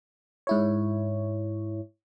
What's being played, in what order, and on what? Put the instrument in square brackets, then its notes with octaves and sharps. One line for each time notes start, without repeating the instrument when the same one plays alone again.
[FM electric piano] G#2 E4 C#5